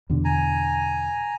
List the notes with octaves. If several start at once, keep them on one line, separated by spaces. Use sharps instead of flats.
E2 B2 D3
G#5 A#5